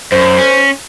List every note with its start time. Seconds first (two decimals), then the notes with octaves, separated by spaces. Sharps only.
0.12 F#2 C5
0.38 C#4